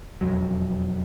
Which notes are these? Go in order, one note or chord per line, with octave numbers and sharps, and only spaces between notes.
E1 F2 F#3